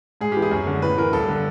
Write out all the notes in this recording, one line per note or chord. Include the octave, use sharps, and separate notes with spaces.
G#2 G#4
E3 G4
G#4
F#2
D3
A2 B4
E3 A#4
G2 A4
D3